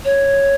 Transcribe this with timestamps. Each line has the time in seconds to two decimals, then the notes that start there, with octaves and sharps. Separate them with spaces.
0.05 C#5